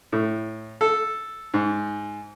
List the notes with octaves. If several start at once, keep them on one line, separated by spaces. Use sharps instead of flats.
A2
A4
G#2